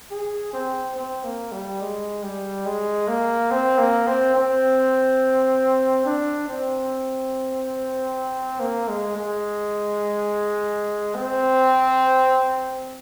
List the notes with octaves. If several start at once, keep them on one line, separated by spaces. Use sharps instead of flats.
G#4
C4
C4
A#3
G3
G#3
G3
G#3
A#3
C4
A#3
C4
C4
D4
C4
A#3
G#3
G#3
C4